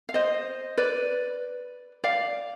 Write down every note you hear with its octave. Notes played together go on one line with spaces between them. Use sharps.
F5
C5 D#5
B4 D5
D5 F5